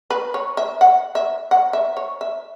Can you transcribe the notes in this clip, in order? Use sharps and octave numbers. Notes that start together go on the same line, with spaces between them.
B4
C#5
E5
F#5
E5
F#5
E5
C#5
E5